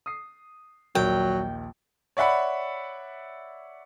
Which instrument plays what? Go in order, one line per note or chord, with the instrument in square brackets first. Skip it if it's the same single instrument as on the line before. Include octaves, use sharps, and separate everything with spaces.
[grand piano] D#6 C7
[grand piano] A#1 D#2 A#4 [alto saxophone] F#3 [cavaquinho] G5
[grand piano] C#5 D5 E5 F#5 B5